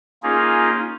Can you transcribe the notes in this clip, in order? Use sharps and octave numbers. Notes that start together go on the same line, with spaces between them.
A#3 C#4 D#4 F4 G#4